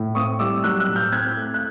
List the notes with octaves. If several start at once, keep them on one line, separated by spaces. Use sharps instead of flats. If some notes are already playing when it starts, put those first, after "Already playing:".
Already playing: A2
C4 C#6 D#6
G3 D6 E6
F#3 E6 F#6
E6 F#6
A2
F6 G6
C4 F#6 G#6
A3
F#6